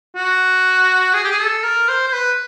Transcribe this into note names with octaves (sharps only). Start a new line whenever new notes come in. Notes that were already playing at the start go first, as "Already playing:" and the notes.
F#4
G#4
G4
G#4
A4
A#4
C5
C5
B4